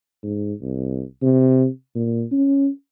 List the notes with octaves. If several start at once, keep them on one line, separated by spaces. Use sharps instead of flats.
G#2
C2
C3
A#2
C#4